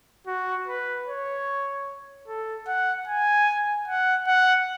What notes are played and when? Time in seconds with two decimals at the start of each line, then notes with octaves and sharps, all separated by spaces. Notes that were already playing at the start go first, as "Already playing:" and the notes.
0.27 F#4
0.67 B4
1.07 C#5
2.28 A4
2.67 F#5
3.07 G#5
3.88 F#5
4.27 F#5